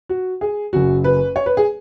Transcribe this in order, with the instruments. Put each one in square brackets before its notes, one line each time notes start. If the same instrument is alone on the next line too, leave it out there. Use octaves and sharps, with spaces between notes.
[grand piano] F#4
G#4
F#1 F#2 F#3 F#4
B4
C#5
B4
G#4